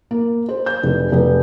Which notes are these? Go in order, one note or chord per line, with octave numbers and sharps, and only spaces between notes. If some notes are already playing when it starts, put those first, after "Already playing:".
A#3
C5
G6
F1
F1